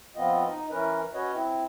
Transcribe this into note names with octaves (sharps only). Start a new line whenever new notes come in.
F3 B3 C4 F4 D#5
D#4
E3 C#4 A#4 B4
C#4 F#4 B4 C#5 D#5
C4 E4